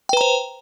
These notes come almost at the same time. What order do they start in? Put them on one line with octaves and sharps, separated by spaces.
G5 B4 A#5 C5